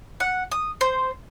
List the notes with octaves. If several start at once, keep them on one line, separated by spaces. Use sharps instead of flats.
F#5
D#6
C5